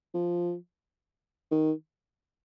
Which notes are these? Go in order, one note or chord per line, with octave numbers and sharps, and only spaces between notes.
F3
D#3